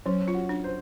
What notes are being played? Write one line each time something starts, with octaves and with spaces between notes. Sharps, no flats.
F#3 C#4
F4
F#4
D4
C5